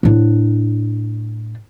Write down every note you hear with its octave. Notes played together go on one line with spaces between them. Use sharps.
A2 D4